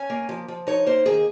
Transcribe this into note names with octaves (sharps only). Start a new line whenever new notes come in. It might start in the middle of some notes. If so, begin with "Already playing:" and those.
Already playing: C#4 G#5
A#3
F3
F3
D#4 C#5
A#3 C5
D#3 G#4